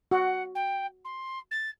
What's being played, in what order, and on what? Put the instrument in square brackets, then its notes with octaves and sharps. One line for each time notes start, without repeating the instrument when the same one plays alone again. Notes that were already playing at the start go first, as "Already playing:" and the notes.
[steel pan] F#4 [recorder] F#5
[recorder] G5
C6
A6